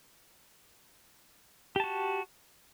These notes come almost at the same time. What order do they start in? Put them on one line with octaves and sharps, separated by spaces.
G4 A5 F#4